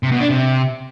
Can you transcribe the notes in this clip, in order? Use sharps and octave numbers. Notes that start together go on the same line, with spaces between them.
C3
B2
D4
C3